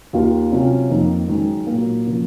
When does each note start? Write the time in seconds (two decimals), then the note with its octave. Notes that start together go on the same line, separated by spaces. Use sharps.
0.13 D#2 D#3 A#3 F4
0.52 C3 F#3 C#4 F4
0.90 F2 D#3 A#3 D#4
1.28 F#2 D#3 G#3
1.67 A#2 F#3 A#3
2.06 C#3 F3 A#3